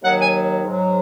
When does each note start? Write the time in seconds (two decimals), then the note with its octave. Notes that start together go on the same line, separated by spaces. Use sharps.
0.03 D#2 D#3 F#3 F#5
0.18 G#5
0.64 G#2 F#3